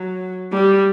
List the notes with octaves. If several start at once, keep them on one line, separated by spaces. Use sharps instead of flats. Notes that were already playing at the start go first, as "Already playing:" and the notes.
Already playing: F#3
G3